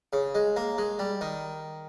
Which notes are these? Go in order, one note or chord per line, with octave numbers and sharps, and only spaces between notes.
C#3
G#3
A#3
G#3
G3
D#3